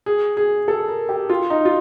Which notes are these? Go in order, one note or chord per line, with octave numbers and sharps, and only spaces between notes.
G#4
G#4
A4
A#4
G4
F4
D#4
F4